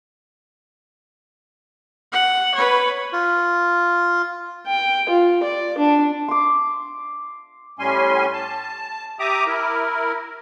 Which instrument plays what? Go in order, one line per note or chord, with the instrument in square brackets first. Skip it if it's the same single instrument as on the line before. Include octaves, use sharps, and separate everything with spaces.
[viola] F#5
B4 C#5
[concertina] F4
[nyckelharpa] G5
F4
D5
D4
[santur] C6 D6
[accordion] A2 G3 C#4 G#5 C6
A5
G4 E5 A#5 D6 D#6
E4 A#4